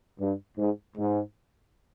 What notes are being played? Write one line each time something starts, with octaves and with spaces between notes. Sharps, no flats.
G2
G#2
G#2